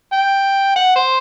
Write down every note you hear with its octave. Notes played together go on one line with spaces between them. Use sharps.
G5
F#5
C5